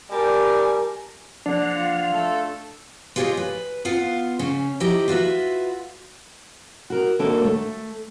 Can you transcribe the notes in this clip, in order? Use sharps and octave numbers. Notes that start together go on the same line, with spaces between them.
G3 G4 A#4 G#5 A5
D3 F3 A#3 D4 F#5
F4
A3 A4
F4 G4 G#4 B4 C#5 D#5
B4
B3 F4 F5 F#5
C#3 C#4
F3 E4 G4 D#5 A#5
F4 F#4 B4 E5
F#4 A#4
D#2 A#3 D4 F#4 A4
A3